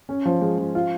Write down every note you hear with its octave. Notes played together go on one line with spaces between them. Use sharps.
C#4
F3
G#3
F3
F4